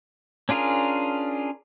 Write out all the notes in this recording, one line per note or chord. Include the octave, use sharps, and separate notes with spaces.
C#4 D4 F4 G#4 A#4